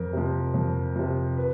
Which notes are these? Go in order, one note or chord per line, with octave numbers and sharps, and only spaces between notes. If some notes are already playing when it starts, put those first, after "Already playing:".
Already playing: F2 A#4
C3 F3
F2
C3 F3
B4